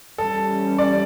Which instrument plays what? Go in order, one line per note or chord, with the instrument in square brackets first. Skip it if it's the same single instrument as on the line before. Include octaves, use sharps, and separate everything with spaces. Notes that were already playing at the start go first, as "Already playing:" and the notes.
[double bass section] E3 G3 C#4 [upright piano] A4
[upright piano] D5